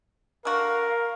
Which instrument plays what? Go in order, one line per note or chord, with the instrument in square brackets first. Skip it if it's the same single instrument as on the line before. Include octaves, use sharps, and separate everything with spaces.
[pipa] D3 F#4 [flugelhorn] A#4 [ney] F5